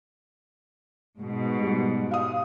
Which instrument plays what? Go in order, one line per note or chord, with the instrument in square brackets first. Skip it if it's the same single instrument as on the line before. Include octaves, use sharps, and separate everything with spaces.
[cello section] G#2 B2
[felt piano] G3
F5 D#6